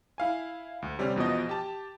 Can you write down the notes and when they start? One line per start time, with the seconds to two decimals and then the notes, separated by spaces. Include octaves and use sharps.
0.18 E4 F5 G#5
0.82 D2
0.99 C3 G3 C4 C#4
1.16 E2 B2 F3 D#5
1.49 G4 A5